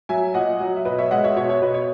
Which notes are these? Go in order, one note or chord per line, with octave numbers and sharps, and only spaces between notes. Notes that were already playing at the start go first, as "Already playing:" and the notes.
F#3 E5 G#5
A#2 D#5 F#5
F#3
E5
B2 B4 D#5
C#5 E5
G#3 D#5 F#5
C#5 E5
B2 C#5
C#5 E5
B2 B4 D#5
C#5